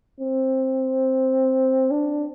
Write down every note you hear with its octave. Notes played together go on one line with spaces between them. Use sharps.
C4
D4